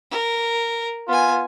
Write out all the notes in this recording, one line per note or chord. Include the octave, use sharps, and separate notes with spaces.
A#4
B3 F4 G#5